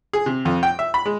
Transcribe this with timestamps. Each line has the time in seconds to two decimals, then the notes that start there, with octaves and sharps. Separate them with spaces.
0.13 G#4
0.26 C3
0.45 F2
0.63 G5
0.79 E5
0.94 B5
1.06 G#3